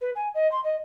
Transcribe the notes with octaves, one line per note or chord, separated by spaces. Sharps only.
B4
G#5
D#5
C6
D#5